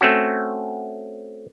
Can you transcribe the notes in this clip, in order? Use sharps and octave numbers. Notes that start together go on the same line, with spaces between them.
A3 C4 C#4 F#4